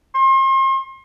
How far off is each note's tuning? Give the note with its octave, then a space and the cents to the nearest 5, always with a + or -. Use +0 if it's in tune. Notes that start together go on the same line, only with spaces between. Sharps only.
C6 +40